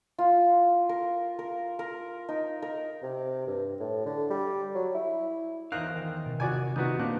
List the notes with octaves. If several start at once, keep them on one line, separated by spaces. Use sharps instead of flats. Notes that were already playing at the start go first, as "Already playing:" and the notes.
F4
A#4
A#4
A#4
D#4
A#4
C3
G2
A2
D3
G3
F#3
E4
E2 D#4 A#4 C5 F5 F#6
D#3
B2
C3 F#4 D5 G#5
C3 D#3 G3 B3 C4 D#4 E4 F#4
A#2 A#3 D4 A#4 C5 F#6